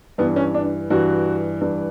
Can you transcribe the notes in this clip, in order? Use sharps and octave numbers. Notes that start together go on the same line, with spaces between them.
G2 E3 B3
C#4
D4
G2 E3 F#4
G2 E3